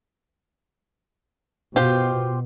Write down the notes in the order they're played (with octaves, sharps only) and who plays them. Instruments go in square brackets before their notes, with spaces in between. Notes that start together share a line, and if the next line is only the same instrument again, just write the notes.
[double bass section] B2 [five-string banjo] F4 G4 C5